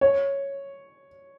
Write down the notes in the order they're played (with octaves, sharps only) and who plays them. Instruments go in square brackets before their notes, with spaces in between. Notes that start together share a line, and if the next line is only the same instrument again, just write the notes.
[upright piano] C#5